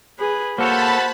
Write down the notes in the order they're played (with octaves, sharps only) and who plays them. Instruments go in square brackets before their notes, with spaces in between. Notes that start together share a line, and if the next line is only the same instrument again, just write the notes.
[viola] G#4 B4
[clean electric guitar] A#3 A4 C#5 [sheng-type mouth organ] F#4 [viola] C5 [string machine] A5 B5